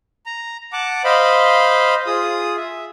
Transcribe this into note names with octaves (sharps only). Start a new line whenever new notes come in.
A#5
F#5 A5 D6
C5 D#5 F5 B5
F4 G#4 D#6
E5